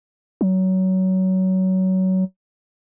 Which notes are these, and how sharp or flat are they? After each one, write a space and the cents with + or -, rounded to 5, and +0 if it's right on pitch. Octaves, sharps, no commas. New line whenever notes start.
F#3 +20